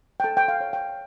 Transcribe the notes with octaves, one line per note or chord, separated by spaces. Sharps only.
G5
A4 A5
G5
F5
C#5
G5